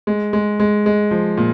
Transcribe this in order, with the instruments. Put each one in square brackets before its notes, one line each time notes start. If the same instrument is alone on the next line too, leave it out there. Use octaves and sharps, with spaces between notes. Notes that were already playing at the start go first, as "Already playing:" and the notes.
[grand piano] G#3
G#3
G#3
G#3
F3
A#2